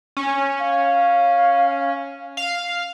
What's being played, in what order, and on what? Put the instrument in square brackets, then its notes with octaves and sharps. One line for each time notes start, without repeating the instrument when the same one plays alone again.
[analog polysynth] C#4
[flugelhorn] F5
[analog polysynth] F5